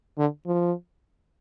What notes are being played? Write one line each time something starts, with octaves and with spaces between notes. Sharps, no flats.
D3
F3